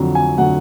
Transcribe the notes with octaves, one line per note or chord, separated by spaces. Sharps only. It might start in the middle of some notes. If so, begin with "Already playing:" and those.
Already playing: F2 D3 F#3
G#5
D3 F#3 F#5